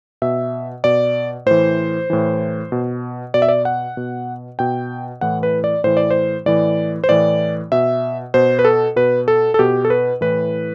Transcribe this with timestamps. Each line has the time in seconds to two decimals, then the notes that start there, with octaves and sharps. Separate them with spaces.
0.22 B2 E5
0.84 B2 D5
1.46 A2 E3 C5
2.10 A2 E3
2.72 B2
3.34 B2 D5
3.42 E5
3.49 D5
3.65 F#5
3.97 B2
4.59 B2 G5
5.21 A2 E3 F#5
5.43 B4
5.64 D5
5.84 A2 E3 C5
5.97 D5
6.11 C5
6.46 A2 E3 D5
7.04 C5
7.09 A2 E3 D5
7.72 B2 E5
8.34 B2 C5
8.59 B4
8.65 A4
8.96 B2 B4
9.28 A4
9.54 A4
9.59 B2 G4
9.85 A4
9.90 B4
10.21 A2 E3 B4